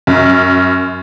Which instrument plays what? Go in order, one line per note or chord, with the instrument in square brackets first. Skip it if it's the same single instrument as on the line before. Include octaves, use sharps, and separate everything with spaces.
[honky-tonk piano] F#2